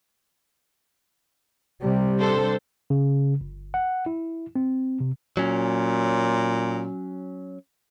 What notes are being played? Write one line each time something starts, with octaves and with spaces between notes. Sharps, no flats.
C3 G3
D4 A4 C5
C#3
G1
F#5
E4
C4
C3
A#2 F#3 C#4